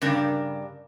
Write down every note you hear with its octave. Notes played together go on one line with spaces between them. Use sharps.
G2 C#3 D4 A#4